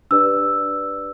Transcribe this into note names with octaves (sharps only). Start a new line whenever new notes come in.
D4 G4 B4 D5 E6